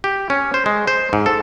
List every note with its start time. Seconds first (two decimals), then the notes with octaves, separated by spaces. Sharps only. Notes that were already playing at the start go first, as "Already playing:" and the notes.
0.04 G4
0.30 C#4
0.54 C5
0.66 G#3
0.87 C5
1.13 G#2
1.26 A4